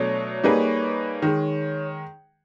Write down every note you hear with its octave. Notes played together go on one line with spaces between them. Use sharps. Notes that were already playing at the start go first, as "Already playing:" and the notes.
Already playing: B2 F#3 A3 D4 C#5
G3 A#3 D#4 G#4 B4
D#3 G#3